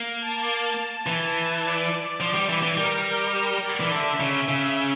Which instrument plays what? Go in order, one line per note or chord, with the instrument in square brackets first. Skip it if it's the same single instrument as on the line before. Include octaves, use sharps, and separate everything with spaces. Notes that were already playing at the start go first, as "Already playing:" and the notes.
Already playing: [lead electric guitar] A#3
[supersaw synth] A5
[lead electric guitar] E3
[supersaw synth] D5
[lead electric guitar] F3
G3
E3
E3
[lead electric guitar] G3 [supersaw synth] A#4
[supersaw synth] A#4
D5
[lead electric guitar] E3
[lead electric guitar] D3 [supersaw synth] E5
[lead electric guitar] C#3
[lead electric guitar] C#3 [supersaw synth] E5